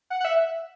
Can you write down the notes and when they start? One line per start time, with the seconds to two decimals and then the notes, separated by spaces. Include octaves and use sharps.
0.10 F#5
0.20 F#5
0.25 E5